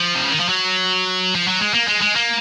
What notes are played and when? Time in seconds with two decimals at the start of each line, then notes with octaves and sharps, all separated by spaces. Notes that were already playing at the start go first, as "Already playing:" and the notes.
Already playing: F3
0.14 C3
0.23 C#3
0.31 D#3
0.40 F3
0.49 F#3
1.35 F3
1.48 F#3
1.61 G#3
1.74 A#3
1.89 G#3
2.02 G#3
2.17 A#3